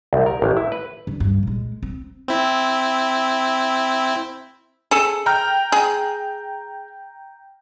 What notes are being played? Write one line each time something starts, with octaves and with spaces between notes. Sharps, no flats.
C2
A#4
A1
E4
B4
D3
G2
A#2 G#3
C4
C4 E4
G#4 A4
G5 A#5 F6
G#4